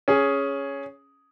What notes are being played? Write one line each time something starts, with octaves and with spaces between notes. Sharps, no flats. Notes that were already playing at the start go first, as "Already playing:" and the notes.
C#4 G#4